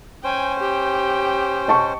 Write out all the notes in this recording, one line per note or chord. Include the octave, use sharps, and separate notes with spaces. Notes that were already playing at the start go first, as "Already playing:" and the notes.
C#4 C5 G5 G#5
G4 G5
D#5 A5 C#6